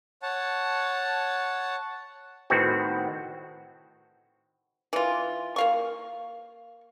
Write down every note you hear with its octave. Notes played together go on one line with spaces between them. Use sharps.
C#5 F#5 A5
A2 D#3 B3 C4 F#4
E3 F4
A#3 F5 C#6